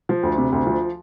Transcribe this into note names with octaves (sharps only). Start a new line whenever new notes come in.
F3
D2
C3
D2
F3